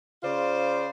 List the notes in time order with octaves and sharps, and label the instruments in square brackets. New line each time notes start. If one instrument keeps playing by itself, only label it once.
[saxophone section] C#3 F4 C5 D5